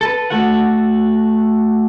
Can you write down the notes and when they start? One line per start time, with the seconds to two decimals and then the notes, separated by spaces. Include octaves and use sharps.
0.01 A4 B4
0.30 A3 F#4 A4 F#5